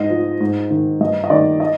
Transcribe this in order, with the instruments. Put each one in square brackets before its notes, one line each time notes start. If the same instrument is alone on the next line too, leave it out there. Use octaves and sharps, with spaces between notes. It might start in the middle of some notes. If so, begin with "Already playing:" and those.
Already playing: [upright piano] G#2 D#5
F3
G#2
D#3
G2 D#5
D#5
D#3 D5
D#5